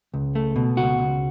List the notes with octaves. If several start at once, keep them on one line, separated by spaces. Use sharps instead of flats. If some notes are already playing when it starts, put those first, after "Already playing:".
C#2
A3
B2
C#2 F#4
C#2